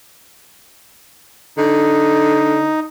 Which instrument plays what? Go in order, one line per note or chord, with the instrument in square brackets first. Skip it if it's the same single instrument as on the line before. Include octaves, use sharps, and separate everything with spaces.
[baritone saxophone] D3 [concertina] D#4